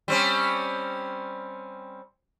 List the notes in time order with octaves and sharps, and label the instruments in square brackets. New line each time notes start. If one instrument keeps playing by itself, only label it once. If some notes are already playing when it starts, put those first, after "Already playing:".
[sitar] G3 C4 C#4